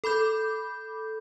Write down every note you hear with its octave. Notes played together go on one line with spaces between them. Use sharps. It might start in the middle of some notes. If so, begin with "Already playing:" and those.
A4 B5 D6 G6